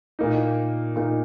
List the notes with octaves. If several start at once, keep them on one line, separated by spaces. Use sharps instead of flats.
A#2 A#3 D#4
A#2 A#3 D#4